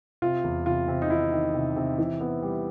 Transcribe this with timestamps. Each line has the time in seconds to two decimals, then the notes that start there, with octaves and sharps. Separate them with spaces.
0.22 C3 F4
0.44 E2
0.65 C3 F4
0.88 C3
1.02 D#4
1.10 D#3 E4
1.31 D#3
1.55 C3
1.76 C3
1.98 E3
2.21 B3
2.43 G3